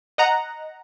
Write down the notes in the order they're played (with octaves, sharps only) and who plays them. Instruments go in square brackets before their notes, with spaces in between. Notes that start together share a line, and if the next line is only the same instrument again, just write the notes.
[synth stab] D#5 F#5 A#5